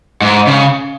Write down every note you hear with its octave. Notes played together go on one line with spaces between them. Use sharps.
G#2
C#3